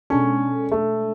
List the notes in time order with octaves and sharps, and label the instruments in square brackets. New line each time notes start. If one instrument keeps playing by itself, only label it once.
[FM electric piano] B2 G#3 D4 A4 [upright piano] C#4
[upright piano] A3